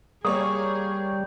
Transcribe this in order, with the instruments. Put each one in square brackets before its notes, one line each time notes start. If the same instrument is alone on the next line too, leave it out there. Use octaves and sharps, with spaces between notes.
[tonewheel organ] G3 [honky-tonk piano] A#3 C#5 D5 [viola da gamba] G#4 [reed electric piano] D#6